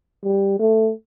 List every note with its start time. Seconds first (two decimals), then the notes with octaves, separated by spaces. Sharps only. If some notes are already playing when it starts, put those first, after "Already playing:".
0.24 G3
0.59 A3